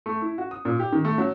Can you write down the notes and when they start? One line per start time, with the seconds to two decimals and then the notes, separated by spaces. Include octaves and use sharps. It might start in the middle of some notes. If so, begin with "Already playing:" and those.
0.06 A3
0.22 E4
0.38 F#4
0.51 D#6
0.65 A#2
0.79 G4
0.92 D#3
1.05 A3
1.18 F#3